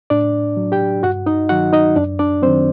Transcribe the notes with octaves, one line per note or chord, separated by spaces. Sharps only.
A2 D4 D5
F#3
G4 G5
G2 F#4 F#5
D#4 D#5
D#3 F#3 F#4 F#5
D#4 D#5
F#2 D4 D5
D4 D5
F#3 C4 C5
D#3